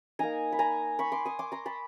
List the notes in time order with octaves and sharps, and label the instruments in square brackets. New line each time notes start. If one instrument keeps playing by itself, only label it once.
[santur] A#3 D#4 G#5 A#5
B5
G#5 A#5
B5 C#6
C6 D6
C#6 D#6
C6 D6
A#5 C6
A5 B5